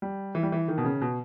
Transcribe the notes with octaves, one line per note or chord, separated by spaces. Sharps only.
G3
E3
G3
E3
D#3
B2
C#3
B2